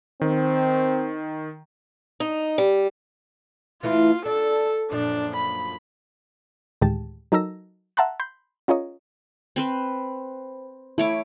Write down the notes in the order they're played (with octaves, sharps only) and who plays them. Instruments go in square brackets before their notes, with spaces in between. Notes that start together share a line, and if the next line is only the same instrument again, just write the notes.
[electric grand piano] D#3 [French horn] C4
[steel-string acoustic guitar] D#4
G3
[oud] E3 A3 E4 [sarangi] F4
[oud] D4 [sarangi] A4
[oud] F#2 A#2 F3 [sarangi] D4
[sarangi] B5
[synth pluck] D2 A2 D#3 G#3 G4 A5
F#3 D#4 A4 A#4 E6 A#6
E5 F#5 A5 A#5 C6 F#6
B5 C6 G6
C#4 F4 G#4 A#4 C#5 D#5
[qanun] C4 B4 C5
[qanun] A3 C#5 D6 [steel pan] E4